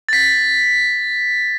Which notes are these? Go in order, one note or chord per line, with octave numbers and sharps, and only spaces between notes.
A6 B6